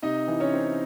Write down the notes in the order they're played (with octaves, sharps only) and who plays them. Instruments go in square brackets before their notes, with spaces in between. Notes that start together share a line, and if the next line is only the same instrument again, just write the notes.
[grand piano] C3 D#4 D#5
E3
C#4 C#5
C4